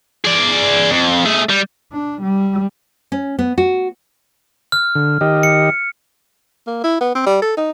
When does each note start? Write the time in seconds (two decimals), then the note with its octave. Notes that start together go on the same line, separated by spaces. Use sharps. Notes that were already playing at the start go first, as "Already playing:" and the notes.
0.25 G#4 D5
0.90 F2
1.25 A3 G#4
1.50 G3
1.93 D4
2.22 G3
3.12 C#4
3.39 B3
3.58 F#4
4.72 F6
4.95 D3
5.21 D#3 G4 D#5
5.43 C#7
6.67 A#3
6.84 E4
7.01 B3
7.15 C4
7.26 G3
7.42 A4
7.57 D#4